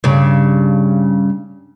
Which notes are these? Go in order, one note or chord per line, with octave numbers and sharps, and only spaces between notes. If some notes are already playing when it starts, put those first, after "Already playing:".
G2 C#3